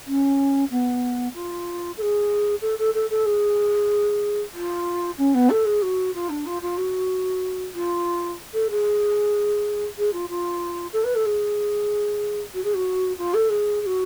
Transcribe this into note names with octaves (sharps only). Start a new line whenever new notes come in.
C#4
B3
F4
A4
G#4
A4
A4
A4
A4
G#4
F4
C#4
B3
A4
G#4
F#4
F4
D4
F4
F4
F#4
F4
A4
G#4
G#4
F4
F4
A4
B4
A4
G#4
F#4
G#4
F#4
F4
A4
G#4
G#4
F#4